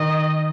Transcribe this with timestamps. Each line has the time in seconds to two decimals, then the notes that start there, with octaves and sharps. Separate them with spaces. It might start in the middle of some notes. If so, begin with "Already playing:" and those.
Already playing: D#3 D#5